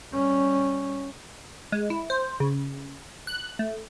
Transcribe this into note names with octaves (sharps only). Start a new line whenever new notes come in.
G3 C#4
G#3
E4
C5
C#3
F#6
A3